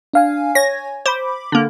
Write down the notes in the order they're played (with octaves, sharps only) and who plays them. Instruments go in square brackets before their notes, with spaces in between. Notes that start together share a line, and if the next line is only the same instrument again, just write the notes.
[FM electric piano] D4 F5 G#5
[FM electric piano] C#5 G#5 G#6 [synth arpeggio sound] A#6
[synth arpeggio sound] C5 [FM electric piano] B5 D6
[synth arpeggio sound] D3 A#3